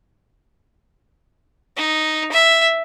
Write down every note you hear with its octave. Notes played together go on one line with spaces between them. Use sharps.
D#4
E5